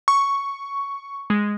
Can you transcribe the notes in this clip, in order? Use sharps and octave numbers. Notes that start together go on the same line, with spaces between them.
C#6
G#3